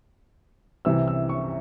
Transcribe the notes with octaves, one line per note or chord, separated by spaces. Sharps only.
C2 C3 E3 E6
E6
C#6